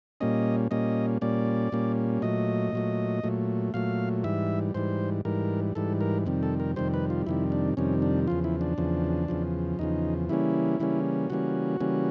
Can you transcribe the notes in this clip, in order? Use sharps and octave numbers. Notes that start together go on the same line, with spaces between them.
A#2 G3 A#3 C#4 D#5
A#2 G3 A#3 C#4 D#5
A#2 G3 A#3 C#4 D5
A#2 G3 A#3 C#4
A#2 F#3 A3 D#5
A#2 F#3 A3
A#2 F#3 A3
A#2 F#3 A3 F5
G#2 E3 G3 E5
G#2 E3 G3 C5
G#2 E3 G3 A#4
G#2 E3 G3 A4
A#4
F2 C3 D#3 G3
A4
A#4
F2 C3 D#3 G3 C5
B4
F4
F2 C3 D#3 G3 E4
D4
F2 C3 D#3 G3 C#4
D4
E2 C#3 F3 F4
E4
D4
E2 C#3 F3
E2 C#3 F3
E2 C#3 F3 D#4
C#3 E3 G3 A#3 C#4 E4
C#3 E3 G3 A#3 C#4
C#3 E3 G3 A#3 C#4 F#4
C#3 E3 G3 A#3 C#4